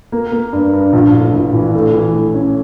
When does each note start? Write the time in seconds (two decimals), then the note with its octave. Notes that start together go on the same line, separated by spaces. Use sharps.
0.12 A#3
0.32 A#3
0.53 G2
0.73 G2
0.93 A#1
1.14 A2
1.34 A#1
1.54 E3
1.74 A3
1.94 E3
2.14 A3
2.34 C#4